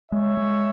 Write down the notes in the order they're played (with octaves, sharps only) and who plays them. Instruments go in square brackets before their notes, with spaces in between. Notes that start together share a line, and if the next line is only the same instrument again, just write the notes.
[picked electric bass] G#3 [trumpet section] C#5 E5
[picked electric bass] G#3